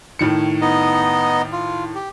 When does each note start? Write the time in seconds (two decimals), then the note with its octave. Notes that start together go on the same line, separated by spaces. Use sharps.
0.19 A2 D#3 C#7
0.61 B3 D#4 D#5
1.52 F4
1.95 G4